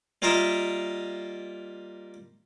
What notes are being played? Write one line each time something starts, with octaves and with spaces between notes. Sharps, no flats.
G3 A#3 F4 A#4 D#5 E5